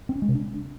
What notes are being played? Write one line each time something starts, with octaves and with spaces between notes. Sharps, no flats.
C4
C#4
G#3
C3
D4